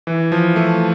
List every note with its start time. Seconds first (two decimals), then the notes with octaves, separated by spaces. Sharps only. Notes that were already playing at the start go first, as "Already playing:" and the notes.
0.07 E3
0.32 F3
0.56 A3